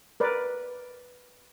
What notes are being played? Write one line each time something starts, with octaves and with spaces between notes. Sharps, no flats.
A#4 B4 D5